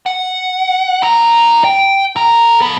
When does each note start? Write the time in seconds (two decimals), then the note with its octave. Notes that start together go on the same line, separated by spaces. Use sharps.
0.06 F#5
1.03 E4 A#5
1.64 G5
2.16 A4 A#5
2.62 F3 B3